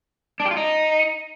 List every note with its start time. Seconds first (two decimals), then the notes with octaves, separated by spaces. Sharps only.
0.40 D4
0.45 G4
0.51 F4
0.57 D#4